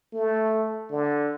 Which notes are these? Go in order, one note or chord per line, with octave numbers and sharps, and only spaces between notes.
A3
D3